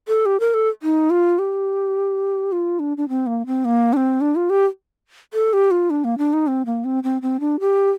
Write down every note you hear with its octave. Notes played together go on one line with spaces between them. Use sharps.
A4
G4
A#4
A4
D#4
F4
G4
F4
D4
D4
C4
A#3
C4
A#3
D4
C4
D4
F4
G4
A4
G4
F4
D4
A#3
D4
D#4
C4
A#3
C4
C4
C4
D4
G4